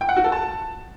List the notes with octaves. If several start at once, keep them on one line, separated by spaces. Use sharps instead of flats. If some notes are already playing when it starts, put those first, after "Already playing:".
G5
F#5
F#4
A4
A5